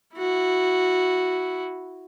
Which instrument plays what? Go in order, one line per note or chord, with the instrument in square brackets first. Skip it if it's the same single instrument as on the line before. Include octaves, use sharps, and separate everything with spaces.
[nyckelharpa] E4 F#4